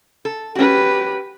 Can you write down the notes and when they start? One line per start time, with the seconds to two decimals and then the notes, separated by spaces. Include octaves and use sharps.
0.25 A4
0.55 C#4 F#4 G4 B4